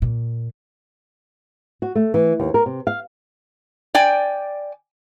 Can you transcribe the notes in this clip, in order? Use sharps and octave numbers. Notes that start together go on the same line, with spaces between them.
A#2
F#4
A3
E3
D#2
A#4
C3
F5
D5 G5 G#5